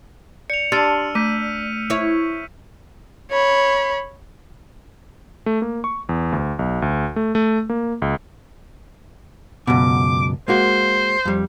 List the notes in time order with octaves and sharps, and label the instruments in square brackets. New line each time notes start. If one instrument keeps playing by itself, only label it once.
[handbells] D5 [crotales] C#7 F7
[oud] D4 [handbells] G4 C6 A6 [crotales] E6 F6 D#7
[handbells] A3 [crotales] G6 B6 D#7
[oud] E4 C#5
[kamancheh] C#5 B5
[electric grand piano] A3
A#3
C#6
E2
D2
B1
D2
A3
A3
A#3
C#2
[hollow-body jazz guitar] C#2 F#2 B2 [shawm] D6
[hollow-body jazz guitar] G#3 A#3 F#4 [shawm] C5
[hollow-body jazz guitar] F2 G3